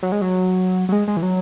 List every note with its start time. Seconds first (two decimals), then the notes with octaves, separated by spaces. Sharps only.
0.03 F#3
0.12 G#3
0.22 F#3
0.89 F#3
0.92 G#3
1.08 G#3
1.17 E3
1.23 F#3